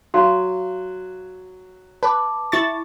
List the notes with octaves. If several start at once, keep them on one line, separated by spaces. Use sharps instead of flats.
F#3 F5 C6
B4 A5 D6
E4 C#6 A6